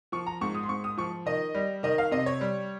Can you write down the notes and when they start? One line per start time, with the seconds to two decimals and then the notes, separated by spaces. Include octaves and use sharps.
0.12 F3 C#6
0.27 A#5
0.41 G#2 C#6
0.54 D#6
0.63 C6
0.69 G#2 C#6
0.84 D#6
0.97 F3 C#6
1.26 D#3 D#5
1.55 G3
1.83 D#3 D#5
1.98 F5
2.11 C3 D#5
2.26 C#5
2.41 G3